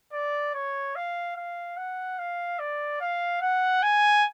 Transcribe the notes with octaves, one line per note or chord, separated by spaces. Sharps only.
D5
C#5
F5
F5
F#5
F5
D5
F5
F#5
G#5